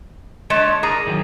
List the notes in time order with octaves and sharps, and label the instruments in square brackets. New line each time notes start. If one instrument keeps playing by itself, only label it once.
[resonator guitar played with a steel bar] G#3 [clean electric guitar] D4 C#5 A5
[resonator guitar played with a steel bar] G#4 A#5 [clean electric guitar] A#4 D5 D#5
[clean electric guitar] D#3 E3 F#3